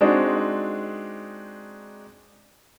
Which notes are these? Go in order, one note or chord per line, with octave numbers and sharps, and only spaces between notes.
G#3 C4 D4 D#4 F#4